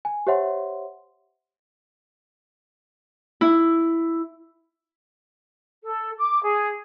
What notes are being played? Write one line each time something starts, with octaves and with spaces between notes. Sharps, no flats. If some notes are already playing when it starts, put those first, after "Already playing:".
G#5
G4 C5 C#5 E5 F#5 C6
E4
A4
D6
G#4